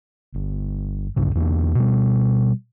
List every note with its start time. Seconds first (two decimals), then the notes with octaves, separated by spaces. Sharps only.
0.34 G1
1.16 D1 B1 G2 C#3
1.35 E2 A#3 D4
1.75 B2 G3